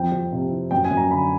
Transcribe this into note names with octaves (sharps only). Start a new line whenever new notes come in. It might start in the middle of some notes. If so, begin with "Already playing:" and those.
Already playing: F2 G5
F2
C3
E3
F#2 G5
G#5
F#2
A#5
D3 B5